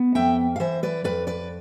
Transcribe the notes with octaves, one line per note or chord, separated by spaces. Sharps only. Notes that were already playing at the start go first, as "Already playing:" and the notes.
Already playing: B3
F2 E5 G5
F5
E3 C5 E5
B4 D5
F2 B4 D5
B4 D5